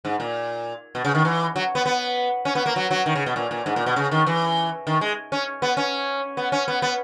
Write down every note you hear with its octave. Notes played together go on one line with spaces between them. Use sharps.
G#2
A#2
B2
C#3
D#3
E3
F#3
B3
B3
C#4
B3
A#3
F#3
F#3
D#3
C#3
B2
A#2
A#2
G#2
A#2
B2
C#3
D#3
E3
D#3
G#3
C#4
B3
C#4
B3
C#4
B3
B3